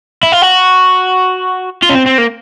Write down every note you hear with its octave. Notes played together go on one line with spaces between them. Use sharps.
E4
F4
F#4
F4
C#4
C4
C4
A#3